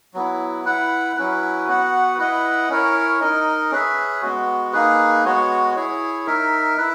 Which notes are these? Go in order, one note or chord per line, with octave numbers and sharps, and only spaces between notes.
F#3 B3 E4
E4 B4 F#5
F#3 C#4 E4 B4
B3 F#4 B4 F#5
E4 B4 D#5 F#5
C#4 E4 A#4 C#5
D#4 A#4 D#5
C#4 G#4 B4 E5
G#3 B3 F#4
A#3 D#4 G#4 B4
G#3 B3 F#4 C#5
E4 G#4 C#5
D#4 A#4 E5
E4 B4 E5